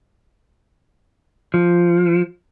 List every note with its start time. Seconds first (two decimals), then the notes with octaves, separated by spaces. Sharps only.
1.54 F3